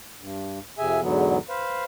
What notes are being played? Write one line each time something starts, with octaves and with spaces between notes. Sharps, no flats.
G2
F2 C3 G#4 E5 G#5
E2 G#2 D3 F#3 B3
B4 C5 F5